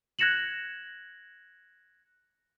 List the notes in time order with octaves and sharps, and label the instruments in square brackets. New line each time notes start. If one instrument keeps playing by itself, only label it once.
[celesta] F#6 G#6 A#6 C#7 E7 F#7